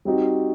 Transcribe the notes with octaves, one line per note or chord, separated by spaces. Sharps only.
G3 C4 D#4 F#4